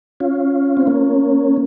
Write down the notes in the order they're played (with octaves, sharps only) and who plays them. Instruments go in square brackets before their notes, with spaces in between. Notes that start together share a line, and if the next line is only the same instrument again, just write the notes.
[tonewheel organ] C#4 F4
C4
A#3 C#4